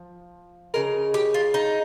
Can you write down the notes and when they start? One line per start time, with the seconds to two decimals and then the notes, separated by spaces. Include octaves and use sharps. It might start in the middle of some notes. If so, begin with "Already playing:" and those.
Already playing: F3
0.74 C#3 G#3 A#4
1.14 G4
1.34 F4
1.54 D#4